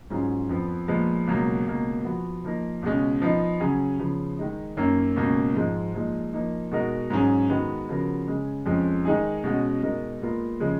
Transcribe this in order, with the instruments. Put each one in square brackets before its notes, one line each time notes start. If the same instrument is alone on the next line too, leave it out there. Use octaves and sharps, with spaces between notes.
[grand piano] G#2 F#3 C#4 F4 G#4
F2 F3 B3
A#2 F3 G#3 B3
C#2 B2 F#3 A#3
C#2 B2 A#3
F3 B3 F#4
F3 A#3 D#4 A#4
C#2 B2 G#3 C#4
F3 B3 D#4
C#3 F#3 C#4 G#4
C#3 F3 B3
D#3 G#3 D#4
F#2 D#3 A#3 C#4
C#2 B2 A#3 C#4
G#2 F3 G#3
A#2 F3 G#3 D#4
F3 A#3 D#4
B2 G#3 D#4 F#4 A#4
G#2 F#3 C#4 G#4
D#3 G#3 B3 F#4
C#3 F3 B3 F#4 A#4
C#3 G#3 C#4 G#4
F2 F3 G#3 C#4
D#3 G#3 D#4 G#4
B2 G#3 C#4 F#4
B2 G#3 D#4 A#4
A#2 G#3 B3 F4 A#4
C#3 F3 G#3